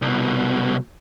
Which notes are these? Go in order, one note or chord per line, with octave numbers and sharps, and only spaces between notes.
C2 B2